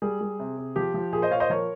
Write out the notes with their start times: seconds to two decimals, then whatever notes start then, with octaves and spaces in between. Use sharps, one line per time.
0.02 G3 G#4
0.21 G3
0.39 C3
0.58 C3
0.76 F3 G4
0.94 F3
1.12 A#2 G#4
1.22 C5 D#5
1.31 A#2 C#5 F5
1.40 C5 D#5
1.50 F3 A#4 C#5